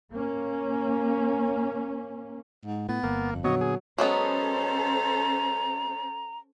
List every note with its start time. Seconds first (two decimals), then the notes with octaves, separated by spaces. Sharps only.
0.13 A#3 C#4
2.65 G#2
2.89 A2 B3
3.03 G1 A#3
3.32 F2
3.44 A#2 D3 F#3 B3 C#5 D#5
3.61 G#4
3.98 F#3 G#3 B3 C#4 A4 C5 A#5